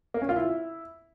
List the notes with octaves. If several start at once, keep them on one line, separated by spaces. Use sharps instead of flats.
A#3
C#4
F4
E4